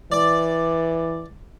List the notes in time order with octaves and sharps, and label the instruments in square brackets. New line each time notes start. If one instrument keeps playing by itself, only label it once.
[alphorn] E3 [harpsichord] D5